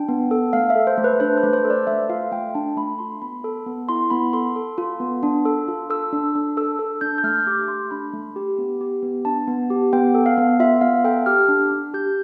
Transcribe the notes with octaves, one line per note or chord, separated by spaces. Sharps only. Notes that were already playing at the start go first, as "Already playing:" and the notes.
Already playing: D4 G5
B3
A4
A3 F5
E5
A4
C5
A3
B4
D4 C5
B4
A3
C5
A4
D5
A3 E5
F4 F5
A3 G5
D4 A5
A3 B5
F4 C6
B3 B5
A4
B3
E4 C6
B3 B5
A4 C6
A4
F4
B3
D4
A4
F4
A4 E6
D4
D4
A4 E6
A4
D4 G6
G6
A3 F6
G4 D6
A3 C6
D4 B5
A3
G4
B3
G4
B3
D4 A5
B3
G4
B3 G5
A4
F5
B3
F4 E5
B3 F5
A4 G5
G4 F6
D4
D4
G4 G6